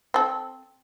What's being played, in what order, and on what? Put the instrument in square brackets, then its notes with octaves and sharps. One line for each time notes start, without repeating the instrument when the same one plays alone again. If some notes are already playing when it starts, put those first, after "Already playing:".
[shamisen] C4 A4